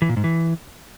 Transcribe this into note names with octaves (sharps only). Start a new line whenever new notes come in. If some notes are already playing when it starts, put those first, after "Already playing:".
E3
A#2
G#2
E3